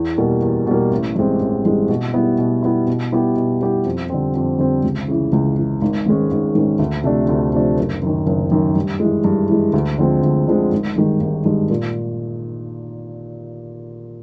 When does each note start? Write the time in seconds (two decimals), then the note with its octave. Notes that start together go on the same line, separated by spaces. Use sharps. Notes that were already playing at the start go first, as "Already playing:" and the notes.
Already playing: E2
0.18 B2 G3 A#3
0.42 E2
0.66 B2 G3 A#3
0.92 A1
1.15 G2 E3 G#3 C4
1.41 A1
1.65 G2 E3 G#3 C4
1.89 B2
2.14 G3 B3 E4
2.38 B2
2.63 G3 B3 E4
2.87 B2
3.12 G3 B3 E4 G4
3.36 B2
3.61 G3 B3 E4 G4
3.85 F2
4.10 D3 G3 C4
4.35 F2
4.58 D3 G3 C4
4.84 C#2
5.08 C#3 E3
5.32 C#2
5.58 C#3 E3
5.82 G#1
6.06 G#2 D#3 G#3 C#4
6.31 G#1
6.55 G#2 D#3 G#3 C#4
6.79 D2
7.04 C3 F3 A3 D4
7.29 D2
7.53 C3 F3 A3 D4
7.77 F#1
8.02 F#2 D#3
8.26 F#1
8.51 F#2 D#3
8.75 G2
9.00 E3 G#3
9.24 G2
9.49 E3 G#3
9.73 D2
9.98 D3 F3 G#3 C4
10.23 D2
10.48 D3 F3 G#3 C4
10.71 G#1
10.96 G2 D#3 G#3
11.21 G#1
11.45 G2 D#3 G#3
11.70 A#2